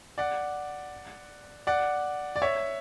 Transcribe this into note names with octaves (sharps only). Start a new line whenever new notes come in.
D5 F#5
D5 F#5
D5
C#5 E5